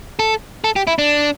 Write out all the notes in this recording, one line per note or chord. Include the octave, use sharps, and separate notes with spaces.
A4
A4
G4
E4
D4